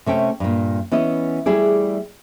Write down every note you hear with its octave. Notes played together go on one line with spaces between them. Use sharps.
C3 A3 C#4 G5
G2 A#2
E3 B3 C#4 E4 D#5
G3 A3 E4 G#4 D5